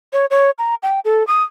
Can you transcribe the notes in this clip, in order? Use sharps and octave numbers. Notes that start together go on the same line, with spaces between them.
C#5
C#5
A#5
G5
A4
D#6